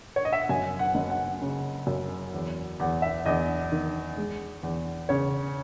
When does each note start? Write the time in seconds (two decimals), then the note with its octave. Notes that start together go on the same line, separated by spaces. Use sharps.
0.16 C#5
0.25 D#5
0.32 E5
0.42 F#5
0.49 F#2 G#5
0.79 F#5
0.95 F#1
1.10 F#5
1.42 C#3
1.87 F#2
2.34 E2
2.80 E2 F#5
3.02 E5
3.26 E2 D#5
3.72 D#3
4.17 G#3
4.63 E2
5.09 C#3 C#5